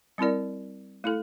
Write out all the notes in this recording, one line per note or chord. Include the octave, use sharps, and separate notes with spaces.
G3 C4 E4 A#4 D5
A3 E4 A4